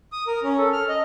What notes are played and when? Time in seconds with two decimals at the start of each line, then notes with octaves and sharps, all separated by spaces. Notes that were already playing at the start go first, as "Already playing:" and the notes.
0.12 D#6
0.27 A#4
0.43 C#4
0.58 A4
0.73 F6
0.89 D#5